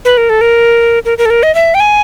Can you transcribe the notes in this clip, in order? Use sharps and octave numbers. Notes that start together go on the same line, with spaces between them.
B4
A#4
A4
A#4
A#4
A#4
A4
A#4
D#5
E5
G5
G#5